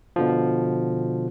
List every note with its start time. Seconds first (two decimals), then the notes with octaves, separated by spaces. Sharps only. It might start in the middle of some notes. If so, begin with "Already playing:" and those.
0.16 B2 D3 F3